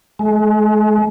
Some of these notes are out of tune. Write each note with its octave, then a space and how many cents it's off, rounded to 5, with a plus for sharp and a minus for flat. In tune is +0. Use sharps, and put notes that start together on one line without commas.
G#3 +40